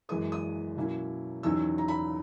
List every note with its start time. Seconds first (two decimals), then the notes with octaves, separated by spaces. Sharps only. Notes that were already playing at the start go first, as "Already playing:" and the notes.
0.09 F#2 E3 G#3 B3 D#6
0.32 D#6
0.76 B2 F#3 A#3 C#4 E4
1.43 E2 D#3 F#3 C#4 E6
1.78 A#5
1.88 B5